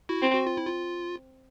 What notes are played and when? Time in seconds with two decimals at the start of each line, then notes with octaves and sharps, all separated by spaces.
0.09 E4 F#4
0.22 C4
0.34 F#4
0.47 F4
0.57 E4
0.67 F4